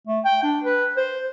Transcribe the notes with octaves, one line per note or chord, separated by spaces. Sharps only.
A3
G5
D4
B4
C5